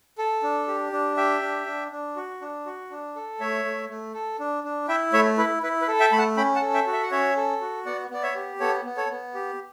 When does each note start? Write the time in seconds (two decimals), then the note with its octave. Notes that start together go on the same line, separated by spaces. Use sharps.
0.18 A4
0.43 D4
0.68 G4
0.92 D4
1.17 G4 E5 G5
1.42 D4
1.67 D4
1.91 D4
2.16 F#4
2.41 D4
2.66 F#4
2.91 D4
3.16 A4
3.40 A3 C#5 E5
3.65 A3
3.89 A3
4.14 A4
4.39 D4
4.64 D4
4.88 E4 E5 G5
5.13 A3 C#5 E5
5.38 E4 B4
5.63 E4 B4
5.82 B4
5.88 A4
6.00 E5 G5
6.12 A3 B5
6.18 F#5 A5
6.37 C#4 G5 B5
6.56 F#5 A5
6.62 A4
6.74 E5 G5
6.87 F#4
6.93 E5
7.02 F#5
7.11 C#4 C#5 E5
7.36 A4
7.61 F#4
7.86 B3 D5 F#5
8.11 B3 D5
8.23 C#5 E5
8.35 G4
8.60 B3 A4 C#5
8.85 B3
8.97 A4 C#5
9.09 B3
9.35 G4